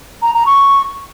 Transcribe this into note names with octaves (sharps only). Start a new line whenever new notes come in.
A#5
A#5
C#6